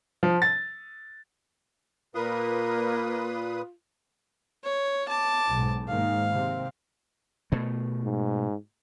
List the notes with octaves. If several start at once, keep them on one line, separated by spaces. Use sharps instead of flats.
F3
A6
A#2 A#3 F4 A#4 B4 D#6
C#5
A5 D6
B1 G#2
G#2 D#3 A#3 F5
C3 C4
B2 A3
G#2